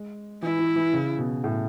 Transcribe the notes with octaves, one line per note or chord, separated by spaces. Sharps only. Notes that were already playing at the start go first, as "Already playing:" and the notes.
Already playing: G#3
E3 E4
E3
E3
C#3
B2
A2